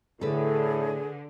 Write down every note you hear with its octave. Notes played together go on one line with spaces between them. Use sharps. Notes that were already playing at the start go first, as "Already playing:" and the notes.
A2 D3 G#4 A4 B4